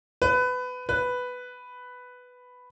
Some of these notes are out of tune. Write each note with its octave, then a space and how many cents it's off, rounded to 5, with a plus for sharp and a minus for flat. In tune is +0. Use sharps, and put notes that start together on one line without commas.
B4 +20
B4 +5